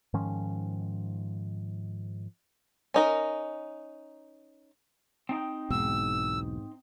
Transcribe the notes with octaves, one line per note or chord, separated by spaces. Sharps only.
G#2 D#3 F3 C#4
C#4 D#4 A#4
C4 D#4 G5
B1 E2 G#2 B2 E6